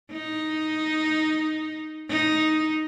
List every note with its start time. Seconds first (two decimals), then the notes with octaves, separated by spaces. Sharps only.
0.13 D#4
2.09 D#4